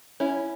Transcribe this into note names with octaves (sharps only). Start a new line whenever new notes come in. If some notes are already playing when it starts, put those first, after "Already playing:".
C#4 E4